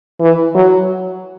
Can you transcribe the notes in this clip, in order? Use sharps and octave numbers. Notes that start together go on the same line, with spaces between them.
E3
F#3